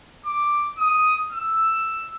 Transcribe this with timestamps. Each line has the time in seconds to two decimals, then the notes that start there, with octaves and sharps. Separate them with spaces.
0.26 D6
0.78 D#6
1.32 E6